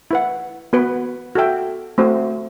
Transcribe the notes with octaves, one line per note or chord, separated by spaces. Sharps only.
E4 B4 F#5
B3 F#4 B4
F#4 A4 E5 G5
A3 C4 F#4 C5